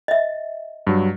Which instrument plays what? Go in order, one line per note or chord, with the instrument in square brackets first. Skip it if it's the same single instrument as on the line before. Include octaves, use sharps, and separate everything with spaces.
[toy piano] D#5 E5
[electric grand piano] G2 F#3